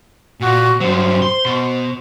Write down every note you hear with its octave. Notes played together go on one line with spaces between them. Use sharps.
A#2 F#4
G2 F#3 C5
C6
B2